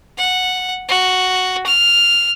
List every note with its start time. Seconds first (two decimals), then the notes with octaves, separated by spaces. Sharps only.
0.18 F#5
0.89 F#4
1.66 F6